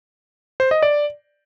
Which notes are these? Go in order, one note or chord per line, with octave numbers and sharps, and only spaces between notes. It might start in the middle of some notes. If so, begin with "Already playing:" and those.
C5
D#5
D5